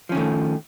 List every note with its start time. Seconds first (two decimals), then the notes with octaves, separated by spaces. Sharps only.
0.09 F3
0.12 C#4
0.14 D#3
0.17 A3